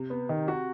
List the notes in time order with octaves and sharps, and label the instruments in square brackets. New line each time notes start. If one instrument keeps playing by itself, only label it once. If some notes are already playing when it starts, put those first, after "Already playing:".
Already playing: [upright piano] C3
[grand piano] B3
D#3
F#4